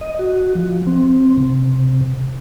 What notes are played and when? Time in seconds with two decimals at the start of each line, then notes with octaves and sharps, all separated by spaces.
0.01 D#5
0.19 F#4
0.55 F3
0.87 C4
1.38 C3